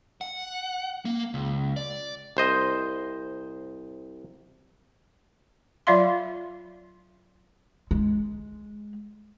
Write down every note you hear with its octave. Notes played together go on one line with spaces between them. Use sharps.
F#5
A#3
C#2
D5
C2 C5 D#5
F#3 F4 D5 E5 F5 C6
G#3